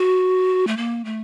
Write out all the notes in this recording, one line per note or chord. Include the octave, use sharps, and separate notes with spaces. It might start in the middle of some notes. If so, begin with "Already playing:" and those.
Already playing: F#4
A3
A#3
A3